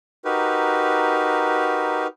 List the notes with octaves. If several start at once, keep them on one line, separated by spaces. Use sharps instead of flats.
D#4 F#4 G4 A#4 B4